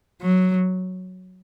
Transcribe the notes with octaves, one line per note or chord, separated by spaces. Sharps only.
F#3